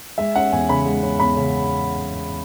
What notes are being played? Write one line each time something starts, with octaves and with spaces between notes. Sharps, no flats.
G#3 E5
C#4 F#5
E2 G#5
C#3 B5
G#3
C#4
E2 B5
C#3